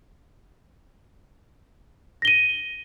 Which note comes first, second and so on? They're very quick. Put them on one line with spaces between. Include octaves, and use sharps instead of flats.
A#6 G7 D#7